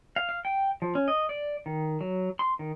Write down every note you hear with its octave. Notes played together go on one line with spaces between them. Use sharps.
F5
F5
G5
F3
C#4
D#5
D5
D#3
F#3
C6
D#3